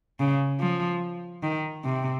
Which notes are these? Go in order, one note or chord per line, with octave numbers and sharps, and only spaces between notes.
C#3
F3
D#3
C3